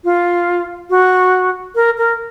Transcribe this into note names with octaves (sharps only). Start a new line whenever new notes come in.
F4
F#4
A#4
A#4